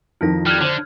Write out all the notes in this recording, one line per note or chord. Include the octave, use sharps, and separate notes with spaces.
F2 D#3 F3 E4 F4 A#6
G3 F6 F#6 G#6
D3 C5